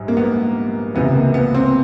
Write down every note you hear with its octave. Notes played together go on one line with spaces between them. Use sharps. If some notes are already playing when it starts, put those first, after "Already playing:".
Already playing: A#1 G#2 G3
A#3
B3
C#2 C3 E3 B3
A#3
B3
C4